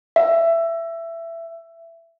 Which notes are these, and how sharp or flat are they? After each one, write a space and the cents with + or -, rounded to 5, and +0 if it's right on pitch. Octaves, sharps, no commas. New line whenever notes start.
E5 +15